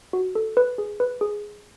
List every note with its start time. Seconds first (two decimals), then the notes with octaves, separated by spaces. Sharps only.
0.13 F#4
0.35 A4
0.57 B4
0.78 G#4
1.00 B4
1.21 G#4